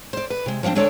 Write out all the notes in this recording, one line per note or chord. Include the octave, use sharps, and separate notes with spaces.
C5 D5
B4
C3 G#3
F3 G3 A#3 C4 D4
D2 G#3 D4 A4 C#5 D5